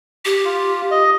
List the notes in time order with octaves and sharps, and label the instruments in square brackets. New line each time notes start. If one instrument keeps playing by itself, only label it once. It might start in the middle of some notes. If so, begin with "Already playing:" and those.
[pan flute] G4
[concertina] F4
D#5